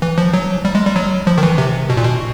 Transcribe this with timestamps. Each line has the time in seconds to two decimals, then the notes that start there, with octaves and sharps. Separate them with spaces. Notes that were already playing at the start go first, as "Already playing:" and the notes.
0.02 E3
0.18 F3
0.34 F#3
0.65 G3
0.75 G#3
0.85 G3
0.96 F#3
1.27 F3
1.38 D#3
1.43 E3
1.58 C3
1.89 B2
1.97 A#2
2.04 B2